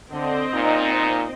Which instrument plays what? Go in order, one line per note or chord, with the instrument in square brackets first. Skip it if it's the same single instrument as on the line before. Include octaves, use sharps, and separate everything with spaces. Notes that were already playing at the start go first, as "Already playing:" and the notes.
[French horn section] D3 [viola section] C4 D#5
[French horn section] A#2 D#4